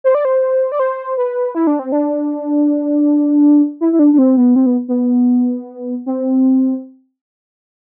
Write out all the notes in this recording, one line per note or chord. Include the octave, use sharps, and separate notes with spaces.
C5
D5
C5
D5
C5
B4
E4
D4
C4
D4
E4
E4
D4
D4
C4
B3
C4
B3
B3
C4